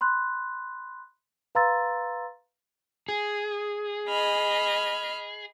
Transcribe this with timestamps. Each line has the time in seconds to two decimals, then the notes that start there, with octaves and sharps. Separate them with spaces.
0.01 B5 C6 F#6
1.55 B4 F5 A#5 C6 E6 A6
3.09 G#4
4.07 D#5 B5 F6